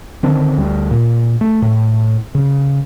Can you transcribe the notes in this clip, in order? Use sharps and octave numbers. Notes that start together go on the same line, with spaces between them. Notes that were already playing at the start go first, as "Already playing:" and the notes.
D3 D#3 C4 D4
D2 G3
A#2
A3
A2
C#3